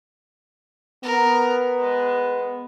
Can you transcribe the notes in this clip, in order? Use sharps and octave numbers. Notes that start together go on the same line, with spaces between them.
B3 A#4
G#3